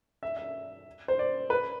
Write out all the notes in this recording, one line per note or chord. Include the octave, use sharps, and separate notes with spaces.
E5
E5
C5
D5
B4